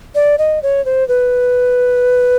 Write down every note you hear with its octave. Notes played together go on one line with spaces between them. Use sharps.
D5
D#5
C#5
C5
B4